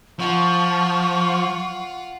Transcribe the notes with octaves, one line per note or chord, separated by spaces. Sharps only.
F3 F4 F#5 C#6